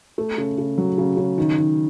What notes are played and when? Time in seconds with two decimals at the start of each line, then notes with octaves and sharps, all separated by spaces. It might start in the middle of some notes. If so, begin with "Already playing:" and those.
0.18 A3
0.38 C#3
0.58 C#3
0.78 F#3
0.98 C#3
1.17 C#3
1.38 D#3
1.58 D#3